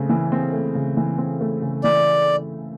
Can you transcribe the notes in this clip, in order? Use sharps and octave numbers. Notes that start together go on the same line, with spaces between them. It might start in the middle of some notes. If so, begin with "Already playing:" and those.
Already playing: C#3 A3 C4
E3
C4
A3
C#3
E3
C4
A3
C#3
E3 D5